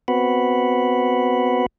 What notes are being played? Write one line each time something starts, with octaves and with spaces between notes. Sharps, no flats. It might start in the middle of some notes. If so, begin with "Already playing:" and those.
B3 C4 F#4 B4 F#5 B5